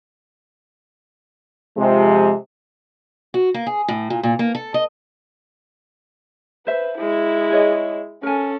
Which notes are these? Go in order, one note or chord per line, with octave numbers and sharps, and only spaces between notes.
C3 F3 G#3
F#4
A#3
G#4
A2
A#2
A#2
A#3
A4
D#5
B4 C5 E5
G#3 E4
G#4 C#5 D#5
C#4 A4 A#4 G#5